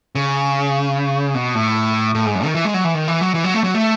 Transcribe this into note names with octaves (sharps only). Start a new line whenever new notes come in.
C#3
B2
A2
A2
G#2
F#2
D#3
E3
G#3
F#3
E3
D#3
E3
F#3
E3
F#3
A3
F#3
A3